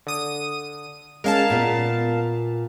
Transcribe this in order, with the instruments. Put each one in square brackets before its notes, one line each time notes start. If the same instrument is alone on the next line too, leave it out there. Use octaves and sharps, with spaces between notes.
[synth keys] D3 D#6 D#7
[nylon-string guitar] G#3 C#4 [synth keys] A#4 F5 A5
[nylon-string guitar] A#2 B3